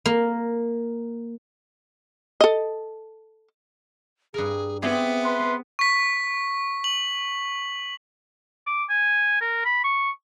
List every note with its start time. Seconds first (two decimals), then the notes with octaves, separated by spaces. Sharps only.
0.06 A#3
2.41 A4 D#5
4.34 G2 G#4 A#4
4.82 B3 C4 G4 G#4 E5
5.24 B4 C6
5.79 C#6 B6
6.84 F#7
8.67 D6
8.90 G#5
9.41 A#4
9.65 B5
9.84 C#6